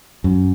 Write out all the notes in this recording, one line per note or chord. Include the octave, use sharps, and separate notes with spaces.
F#2